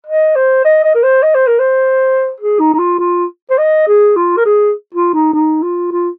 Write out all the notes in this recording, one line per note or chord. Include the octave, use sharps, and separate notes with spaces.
D#5
C5
D#5
D#5
A#4
C5
D#5
C5
A#4
C5
G#4
D#4
D#4
F4
F4
C5
D#5
G#4
F4
A#4
G#4
F4
D#4
D#4
F4
F4